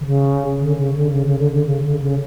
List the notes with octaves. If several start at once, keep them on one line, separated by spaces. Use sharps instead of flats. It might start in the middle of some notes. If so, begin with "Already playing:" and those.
D3
C#3
D3
C#3
D3
C#3
C#3
D3
D3
C#3
D3
C#3